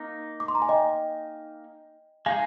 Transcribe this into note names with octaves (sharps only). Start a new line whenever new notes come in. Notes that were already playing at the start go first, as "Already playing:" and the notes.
Already playing: A#3 D#4
D6
C6
A#5
G#5
D#5 G5
G#3 D#4 G#4 F5 G#5